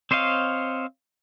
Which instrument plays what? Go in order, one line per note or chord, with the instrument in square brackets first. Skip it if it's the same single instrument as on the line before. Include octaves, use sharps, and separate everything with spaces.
[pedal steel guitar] C4 C5 C#5 D#5 F5